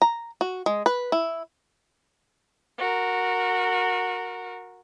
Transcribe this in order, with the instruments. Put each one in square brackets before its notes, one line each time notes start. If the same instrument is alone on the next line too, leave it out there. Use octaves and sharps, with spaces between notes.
[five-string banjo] A#5
F#4
G#3
B4
E4
[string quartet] F#4 A#4